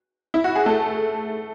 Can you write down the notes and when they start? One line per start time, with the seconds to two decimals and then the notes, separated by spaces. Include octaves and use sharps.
0.34 E4
0.44 F#4
0.56 G#4
0.66 A3 A4